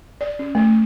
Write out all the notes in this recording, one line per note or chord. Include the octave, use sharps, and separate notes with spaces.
D5
C#4
A3